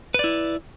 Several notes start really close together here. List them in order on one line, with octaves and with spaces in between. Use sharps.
B4 D5 E4